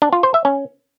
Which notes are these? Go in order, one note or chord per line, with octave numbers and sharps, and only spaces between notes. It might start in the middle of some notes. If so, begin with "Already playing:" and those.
D4
F4
C5
E5
C#4